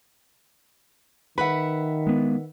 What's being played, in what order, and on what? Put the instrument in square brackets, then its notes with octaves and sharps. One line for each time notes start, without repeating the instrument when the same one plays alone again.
[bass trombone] D#3 [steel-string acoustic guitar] B4 E5 F#5 [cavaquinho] B5
[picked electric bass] G#3 B3